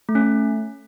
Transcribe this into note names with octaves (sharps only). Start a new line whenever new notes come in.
A3
C#4
A3